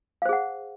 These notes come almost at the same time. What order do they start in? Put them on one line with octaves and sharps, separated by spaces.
F5 C5 G#4 F#5